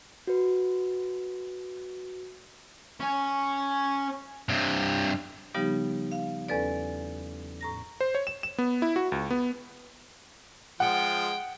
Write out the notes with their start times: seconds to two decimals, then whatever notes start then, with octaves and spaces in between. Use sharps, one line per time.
0.27 F#4 B4
3.00 C#4
4.49 G2 C3
5.54 C#3 F3 G3 B3 D#4 G4
6.12 F5
6.49 E2 C#4 A4 B4 D5
7.61 A2 A#5 A#6
8.01 C5
8.15 C#5
8.27 E7
8.43 E7
8.58 B3
8.82 E4
8.96 F#4
9.12 C#2
9.31 B3
10.80 F3 G#3 F#5 G5